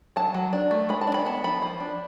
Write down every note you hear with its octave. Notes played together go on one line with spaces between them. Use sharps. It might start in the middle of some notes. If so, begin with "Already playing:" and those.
F#3 A5
F#3
D4
A3
G#3 B5
A5
D4
B5
B3 A5
F3 B5
F3
D4